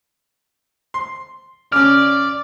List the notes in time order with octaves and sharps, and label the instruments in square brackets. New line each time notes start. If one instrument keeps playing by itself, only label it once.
[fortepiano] C6
[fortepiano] C#3 C#4 [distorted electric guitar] D5 [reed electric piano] F6